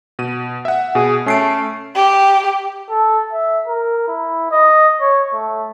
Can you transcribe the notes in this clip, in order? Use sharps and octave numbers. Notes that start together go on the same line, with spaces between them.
B2 D#7
E5 F#5
B2 G#4
A3 C#4 C7 D7
G4
A4
E5
A#4
E4
D#5
C#5
A3